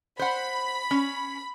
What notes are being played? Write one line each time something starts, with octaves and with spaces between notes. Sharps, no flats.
C5 F#5 B5
C#4